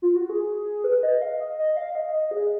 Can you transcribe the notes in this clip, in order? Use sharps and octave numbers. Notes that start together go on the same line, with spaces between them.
F4
F#4
G#4
B4
D#5
F5
D#5
D#5
F5
D#5
D#5
G#4